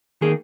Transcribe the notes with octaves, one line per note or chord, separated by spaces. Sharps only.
D#3 A#3 G#4